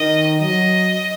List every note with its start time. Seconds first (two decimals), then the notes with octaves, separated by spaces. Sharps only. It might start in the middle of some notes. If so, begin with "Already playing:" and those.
Already playing: D#3 D#5
0.41 F#3 D#5